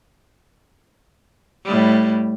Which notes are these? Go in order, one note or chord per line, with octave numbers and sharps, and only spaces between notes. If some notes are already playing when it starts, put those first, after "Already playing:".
A2 G3